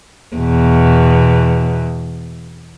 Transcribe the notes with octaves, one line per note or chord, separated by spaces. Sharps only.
E2 B2